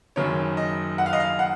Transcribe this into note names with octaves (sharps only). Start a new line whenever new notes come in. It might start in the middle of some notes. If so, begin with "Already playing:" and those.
F#1 F#2 D#3 C#5
D#5
F#5
F5
D#5
F5
F#5